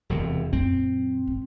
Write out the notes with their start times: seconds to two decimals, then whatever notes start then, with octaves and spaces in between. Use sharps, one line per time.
0.10 E1 E2 C3
0.53 F#2 A#2 C4
1.26 G#2 C#4